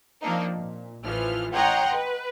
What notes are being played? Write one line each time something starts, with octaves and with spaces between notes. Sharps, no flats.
F3 A#3 C4 D4 D#4
A#2
A1 E3 F3 F6
C#5 D#5 F#5 G5 A#5 C6
B4